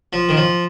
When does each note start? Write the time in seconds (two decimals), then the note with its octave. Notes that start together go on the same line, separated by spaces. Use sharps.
0.13 F3
0.29 D#3
0.37 F3